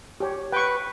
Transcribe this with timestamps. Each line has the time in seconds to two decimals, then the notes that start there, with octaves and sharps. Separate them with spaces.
0.20 G4 C#5
0.53 B4 G5 C#6